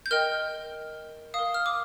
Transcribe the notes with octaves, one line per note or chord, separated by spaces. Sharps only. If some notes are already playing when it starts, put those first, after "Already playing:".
G6
A#4 D#5 G5 F6
A#4 F5 D#6
F6
D6